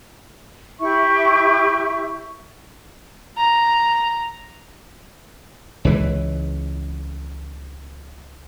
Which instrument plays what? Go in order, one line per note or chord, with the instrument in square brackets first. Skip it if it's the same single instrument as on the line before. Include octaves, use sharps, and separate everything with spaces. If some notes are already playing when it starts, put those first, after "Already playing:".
[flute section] E4 G4 E5 C#6
[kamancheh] A#5
[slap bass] C#2 E3